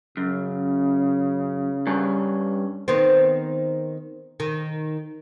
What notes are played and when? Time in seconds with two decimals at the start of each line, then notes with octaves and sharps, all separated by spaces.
0.17 F#2 C#3
1.87 G2 C#4
2.88 D#3 B3 C4
4.40 D#3